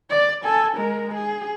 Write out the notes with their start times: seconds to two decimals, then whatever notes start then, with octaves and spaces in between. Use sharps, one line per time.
0.10 D5
0.44 A4 G#5
0.76 G#3 A#4
1.15 G#4